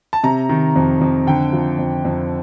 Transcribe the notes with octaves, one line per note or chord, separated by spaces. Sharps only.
A5
C3 A#5
D#3
F2
F2
D3 G5
F3
F2
F2